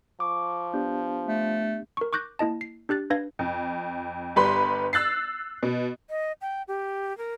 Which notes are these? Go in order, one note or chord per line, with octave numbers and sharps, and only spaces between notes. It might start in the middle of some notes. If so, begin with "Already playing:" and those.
F3 C#6 D6
B3 D4 G4 G6
A3
A#4 C#6
C#6 D6 F#6 G6 A#6
A#3 E4 D#5 A5
C7
D4 G4 F#6 A6
D4 B4 F5 G#6 A#6
F2
G1 G3 B4 B5 C6
E6 F#6 A6 C7
B2
D#5
G5
G4
A#4